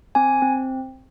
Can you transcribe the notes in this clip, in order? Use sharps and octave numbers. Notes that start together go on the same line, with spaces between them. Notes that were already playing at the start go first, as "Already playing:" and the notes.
C4 G#5
C4